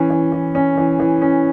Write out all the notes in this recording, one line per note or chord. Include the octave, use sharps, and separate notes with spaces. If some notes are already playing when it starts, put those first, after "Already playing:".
Already playing: E3 C#4
E3
E3
C#4
E3
E3
C#4